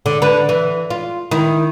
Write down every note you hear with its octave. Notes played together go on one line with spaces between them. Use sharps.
D3
D3 B4
E3
F4
D#3 E4